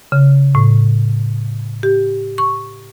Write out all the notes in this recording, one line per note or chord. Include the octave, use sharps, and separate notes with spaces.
C#3
A2
G4
C#6